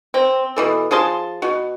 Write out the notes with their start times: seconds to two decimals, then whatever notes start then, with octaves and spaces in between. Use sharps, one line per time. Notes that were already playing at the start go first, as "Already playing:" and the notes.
0.14 C4
0.56 B2 E3 A4
0.91 F3 G#4 A5 C6
1.42 B2 F#4